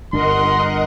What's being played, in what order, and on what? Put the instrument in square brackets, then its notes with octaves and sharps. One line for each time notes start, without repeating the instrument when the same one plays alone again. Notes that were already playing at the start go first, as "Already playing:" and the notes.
[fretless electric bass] G1 D4 [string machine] A#4 D#5 F#5 [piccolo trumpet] C6